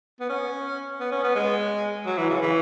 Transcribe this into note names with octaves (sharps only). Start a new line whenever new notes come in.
B3
C#4
B3
C#4
B3
G#3
F#3
E3
C#3
E3